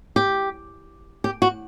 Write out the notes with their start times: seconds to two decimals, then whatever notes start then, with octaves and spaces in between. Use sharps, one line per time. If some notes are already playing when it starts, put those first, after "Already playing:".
0.16 G4
1.24 G4
1.42 F#4